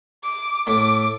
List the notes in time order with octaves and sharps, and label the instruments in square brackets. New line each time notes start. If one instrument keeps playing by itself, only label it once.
[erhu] D6
[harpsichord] A2 A3 [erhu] D6